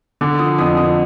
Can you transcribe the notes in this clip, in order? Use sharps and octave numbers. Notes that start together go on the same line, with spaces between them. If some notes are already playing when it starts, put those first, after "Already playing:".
D3 D6
F3 D#6
F2 D#6
F2 D#6